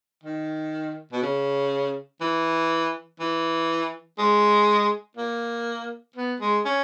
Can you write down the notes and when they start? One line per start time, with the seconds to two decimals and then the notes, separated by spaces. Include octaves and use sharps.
0.24 D#3
1.12 B2
1.22 C#3
2.21 E3
3.20 E3
4.18 G#3
5.17 A#3
6.16 B3
6.40 G#3
6.65 C#4